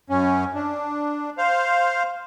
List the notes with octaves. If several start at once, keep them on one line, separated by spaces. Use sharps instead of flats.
F#2 C#4
D4
C5 F5